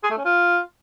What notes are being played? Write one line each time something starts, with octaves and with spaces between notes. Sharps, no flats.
G#4
A3
C#4
F4